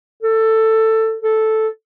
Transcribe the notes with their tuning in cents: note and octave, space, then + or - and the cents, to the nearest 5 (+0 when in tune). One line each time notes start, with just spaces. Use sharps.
A4 +15
A4 -5